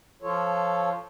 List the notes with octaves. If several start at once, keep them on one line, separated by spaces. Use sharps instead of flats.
F3 F4 A4 C#5